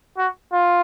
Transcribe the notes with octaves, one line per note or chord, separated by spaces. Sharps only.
F#4
F4